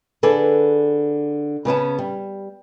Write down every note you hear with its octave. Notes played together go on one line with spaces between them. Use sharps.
D3 G#4 A4 B4 D5
C#3 B3 C#4 A5
G3